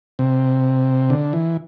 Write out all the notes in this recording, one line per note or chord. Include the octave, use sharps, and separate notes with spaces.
C3
D3
E3